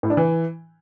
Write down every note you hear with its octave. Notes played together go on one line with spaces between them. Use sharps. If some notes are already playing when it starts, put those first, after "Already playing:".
A2
D4
E3